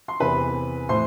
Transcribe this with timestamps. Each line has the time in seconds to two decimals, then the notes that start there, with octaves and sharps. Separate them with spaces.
0.08 C6
0.20 E2 C3 E3 B4 B5
0.89 A2 E3 C5 C6